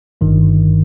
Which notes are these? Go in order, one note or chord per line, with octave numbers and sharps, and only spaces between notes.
G1 G2 D#3